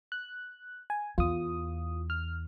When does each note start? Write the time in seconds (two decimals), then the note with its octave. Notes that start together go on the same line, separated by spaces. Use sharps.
0.12 F#6
0.90 G#5
1.18 E2 F4 D#6
2.10 F6